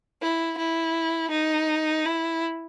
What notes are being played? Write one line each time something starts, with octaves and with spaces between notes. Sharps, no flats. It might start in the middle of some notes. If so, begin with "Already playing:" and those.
E4
E4
D#4
E4